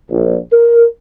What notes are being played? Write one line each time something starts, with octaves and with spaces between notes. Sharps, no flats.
A#1
A#4